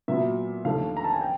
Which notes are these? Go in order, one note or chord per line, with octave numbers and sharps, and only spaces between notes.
A#2 F#3 B3 E5
D#2 D3 F3 A3 F5
A#5
A5
G#5
G5